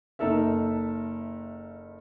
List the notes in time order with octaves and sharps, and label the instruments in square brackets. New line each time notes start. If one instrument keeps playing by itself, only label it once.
[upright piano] F#1 D#4 A4 A#4 E5